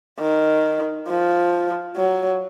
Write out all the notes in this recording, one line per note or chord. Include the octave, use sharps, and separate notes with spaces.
D#3
F3
F#3